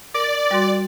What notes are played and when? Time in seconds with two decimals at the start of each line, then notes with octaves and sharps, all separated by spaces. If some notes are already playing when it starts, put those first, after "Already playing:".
0.14 A#4 D5
0.51 G3 F#4 C6